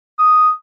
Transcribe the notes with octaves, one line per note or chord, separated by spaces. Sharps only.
D#6